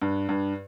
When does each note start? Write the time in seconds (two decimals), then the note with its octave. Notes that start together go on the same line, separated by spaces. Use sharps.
0.02 G2
0.29 G2